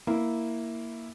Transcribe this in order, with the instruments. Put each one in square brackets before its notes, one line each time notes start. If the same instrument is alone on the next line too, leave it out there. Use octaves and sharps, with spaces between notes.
[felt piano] A#3 E4